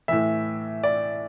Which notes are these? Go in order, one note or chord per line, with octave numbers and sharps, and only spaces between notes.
A2 E3 E5
D5